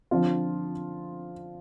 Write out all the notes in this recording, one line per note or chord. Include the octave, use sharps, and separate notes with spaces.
D3 F3 C4 F4